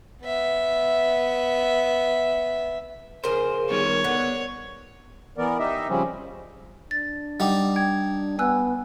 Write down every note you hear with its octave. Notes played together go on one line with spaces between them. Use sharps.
B3 E5
C#3 F3 G#4 A#4 C5
D#3 G3 B3 C#5
D3 B3 F#5
E3 B3 A#4 D5
D#4 G4 D#5 E5
C#3 F3 G3 C4 C#4
D4 A6
G3 D#4 F#5 D6
G5 G#6
B3 G#5 E6 F#6